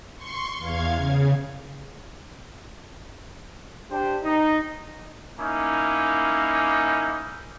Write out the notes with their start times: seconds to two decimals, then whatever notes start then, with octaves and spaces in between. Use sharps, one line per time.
0.16 C6 C#6
0.59 E2 F5 G#6
0.95 C#3
3.91 D4 G4 C5
4.24 D#4
5.39 A#3 C#4 D#4 E4